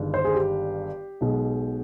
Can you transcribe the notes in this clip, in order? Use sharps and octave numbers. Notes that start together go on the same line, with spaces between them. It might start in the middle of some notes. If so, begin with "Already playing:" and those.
Already playing: G1 G2 D#3 G#3
C5
G#4
G4
B1 B2 G#3